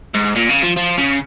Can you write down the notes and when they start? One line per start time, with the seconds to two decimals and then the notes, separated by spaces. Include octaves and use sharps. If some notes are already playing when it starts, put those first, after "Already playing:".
0.14 G#2
0.35 A#2
0.49 C#3
0.63 F3
0.76 F3
0.97 C#3